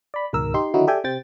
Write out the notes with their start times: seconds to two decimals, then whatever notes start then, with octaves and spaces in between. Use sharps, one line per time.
0.14 D5 B5
0.33 C#2 G#2 B2 D#3 A#4 E6
0.54 D#4 G4 C6
0.74 D3 D#3 F#3 D#4 E4 F#4
0.87 G4 A4 D5 E5 G5 G#5
1.04 C3 C4 G5 A6